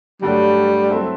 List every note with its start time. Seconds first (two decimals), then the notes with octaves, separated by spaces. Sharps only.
0.22 G2 D3 F#3 G3 A3
0.90 F#3 C4 E4 A4 E5